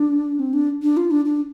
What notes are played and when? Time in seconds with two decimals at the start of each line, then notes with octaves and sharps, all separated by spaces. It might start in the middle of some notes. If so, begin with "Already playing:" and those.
Already playing: D4
0.39 C4
0.53 D4
0.82 D4
0.97 F4
1.11 D4
1.25 D4